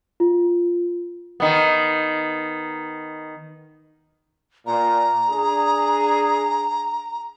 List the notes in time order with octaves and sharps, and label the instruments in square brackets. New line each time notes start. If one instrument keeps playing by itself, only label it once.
[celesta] F4
[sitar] D#3 B3
[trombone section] A#2 [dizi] A#5
[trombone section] D4 G#4